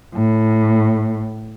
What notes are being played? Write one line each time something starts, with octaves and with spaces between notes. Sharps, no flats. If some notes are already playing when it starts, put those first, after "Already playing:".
A2